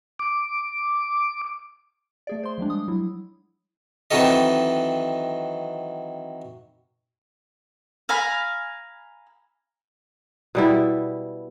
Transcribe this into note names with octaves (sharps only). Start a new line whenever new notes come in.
D6
A3 G#4 D5
C5 C6
F3 G3 G#3 D4
D#6
F#3 E4
D#3 E3 F#3 C4 A4 D#5
F5 G#5 A#5 B5
B2 G3 E4